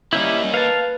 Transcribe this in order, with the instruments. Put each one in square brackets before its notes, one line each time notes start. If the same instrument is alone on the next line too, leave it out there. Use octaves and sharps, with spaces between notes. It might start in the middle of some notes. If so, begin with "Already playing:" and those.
[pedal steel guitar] G3 C#4 E4 [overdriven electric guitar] A#3 D#4 [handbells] G6
[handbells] B4 [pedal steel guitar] F5 A5